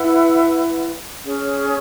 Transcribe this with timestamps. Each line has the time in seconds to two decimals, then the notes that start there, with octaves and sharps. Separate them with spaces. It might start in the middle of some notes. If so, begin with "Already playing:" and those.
Already playing: E4 B4 F#5
1.23 C#4 G#4 C#5